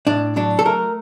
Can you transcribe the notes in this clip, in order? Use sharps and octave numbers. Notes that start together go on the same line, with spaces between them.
A2 D4
F#3 D4
A4
A3 A#4